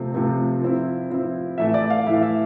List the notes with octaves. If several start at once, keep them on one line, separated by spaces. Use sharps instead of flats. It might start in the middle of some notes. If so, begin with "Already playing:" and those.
Already playing: C3 F3 A3 C4
C3 F3 A3 C4
F3 C4 E4
F3 C4 E4
A2 E3 A3 E4 E5
D5
F5
A2 E3 A3 E4 E5
E5